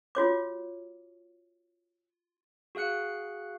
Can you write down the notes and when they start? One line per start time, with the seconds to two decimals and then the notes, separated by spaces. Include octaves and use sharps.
0.15 F4 F#4 C#5 D6
2.75 F#4 G#4 F5 F#6 C#7